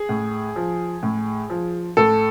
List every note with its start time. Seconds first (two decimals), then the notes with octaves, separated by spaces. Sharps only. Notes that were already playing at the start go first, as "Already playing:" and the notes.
Already playing: G#4
0.09 A2
0.56 F3
1.03 A2
1.50 F3
1.97 A2 A4